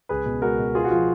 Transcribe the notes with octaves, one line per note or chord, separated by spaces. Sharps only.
C#2 G#4 B4
B2
G#3 F#4 A#4
B2
B3 F4 G#4
F#4
F3 F4